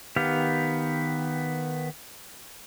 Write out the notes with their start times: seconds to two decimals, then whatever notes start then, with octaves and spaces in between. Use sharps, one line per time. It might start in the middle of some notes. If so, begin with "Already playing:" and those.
0.16 D#3 B3 G4 F5